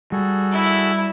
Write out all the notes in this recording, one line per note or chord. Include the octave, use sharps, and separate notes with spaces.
G3 F#4 G#4 A4
E4